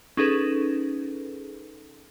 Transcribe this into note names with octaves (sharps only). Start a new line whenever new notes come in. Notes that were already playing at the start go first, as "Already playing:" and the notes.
C#4 D#4 G#4 A4 B4